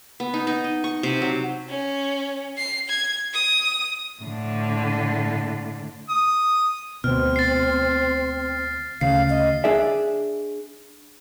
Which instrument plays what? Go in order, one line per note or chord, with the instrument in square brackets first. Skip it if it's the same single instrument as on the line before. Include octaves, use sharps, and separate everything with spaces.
[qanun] B3
D#4
D#4
D#5
C#6
C3
F#3
[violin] C#4
C7
G#6
D#6
[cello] A2 D3
[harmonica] D#6
[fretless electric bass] D2 B2 [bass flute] C4 [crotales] F6
[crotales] A6 C7
[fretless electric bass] D2 C#3 [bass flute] F5 [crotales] C7
[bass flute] D#5
[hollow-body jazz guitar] D4 G#4 D5 E5